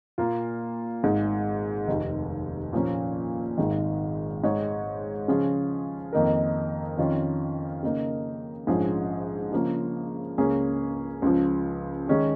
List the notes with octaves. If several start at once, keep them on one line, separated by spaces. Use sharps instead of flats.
A#2 A#3 F4
G#1 G#2 G#3
F1 D#2 D#3
A#2 F3 A#3 C#4
G#1 G#2 D#3
G#2 G#3 D#4 C#5
C#3 F3 C#4 F4 G#4
F2 D#3 A#3 D#4 A#4
F2 D#3 C#4 F4
C#3 A#3 D#4 A#4
A#1 G#2 F3 C#4 G#4
C#3 F3 A#3 C#4
C#2 C#3 A#3 C#4 G#4
C#2 C#3 F3
D#3 G#3 C#4 G#4